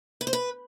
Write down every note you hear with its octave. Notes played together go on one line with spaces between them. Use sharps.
B4
C5
B4